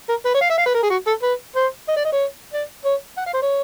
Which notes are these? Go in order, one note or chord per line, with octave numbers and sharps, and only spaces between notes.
A#4
B4
C#5
F5
E5
F5
B4
A#4
G#4
F#4
A4
B4
C5
D#5
D5
D#5
C#5
D5
C#5
F#5
F5
C5
C#5